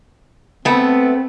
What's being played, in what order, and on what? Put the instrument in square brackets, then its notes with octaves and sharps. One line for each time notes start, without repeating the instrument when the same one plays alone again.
[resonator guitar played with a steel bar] A3 B3 [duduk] C4